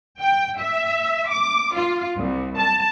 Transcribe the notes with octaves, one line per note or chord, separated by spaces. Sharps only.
G5
E5
D6
F4
C2
A5